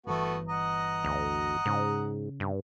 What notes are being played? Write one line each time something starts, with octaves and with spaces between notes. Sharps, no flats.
G1 E3 A3 B3 F#4
D#5 F#5 A#5
D2
G#2 C#3
G2